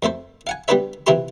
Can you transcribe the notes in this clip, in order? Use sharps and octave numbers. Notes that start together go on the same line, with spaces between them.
F2 A3 A4 C5
F5 F#5 G#5
G3 B3 D4 B4 C5 E5
C3 E3 E4 F4 G4 C6